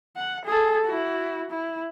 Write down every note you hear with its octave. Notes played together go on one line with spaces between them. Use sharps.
F#5
G#4 A4
E4 F#4
E4